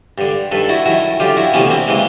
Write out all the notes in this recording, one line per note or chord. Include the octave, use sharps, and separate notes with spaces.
G2 D3
G2 D#3 A4 B4
E4 F#4
F#2 D#3 E4 F#4
F#2 D3 F4 G4
E4 F#4
D2 C3 E3 B3 C#4
A#3 C4
C#3 E3 G#3 A#3